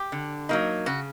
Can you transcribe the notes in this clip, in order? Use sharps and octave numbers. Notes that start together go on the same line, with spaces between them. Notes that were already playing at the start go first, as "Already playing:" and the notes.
Already playing: G4
D3
F#3 A#3 D#4
C#3 F#4